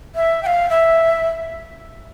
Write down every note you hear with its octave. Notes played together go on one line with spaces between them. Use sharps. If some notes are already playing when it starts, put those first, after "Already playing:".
E5
G5
F5
E5